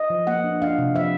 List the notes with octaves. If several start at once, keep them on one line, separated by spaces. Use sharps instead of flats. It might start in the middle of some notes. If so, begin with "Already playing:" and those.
Already playing: D#5
F3
A#3 F#5
D4
D4 F5
C3
F3 E5